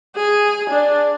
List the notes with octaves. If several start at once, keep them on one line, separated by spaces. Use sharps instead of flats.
G#4
D4